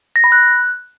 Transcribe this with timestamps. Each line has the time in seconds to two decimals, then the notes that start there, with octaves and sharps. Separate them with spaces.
0.16 A#6
0.24 B5
0.32 F#6